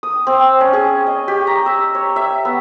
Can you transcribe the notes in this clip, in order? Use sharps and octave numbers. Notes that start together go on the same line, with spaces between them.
D#6
C4
C#4
G#4
D#5
G4
A#5
E6
C#5
E5
B3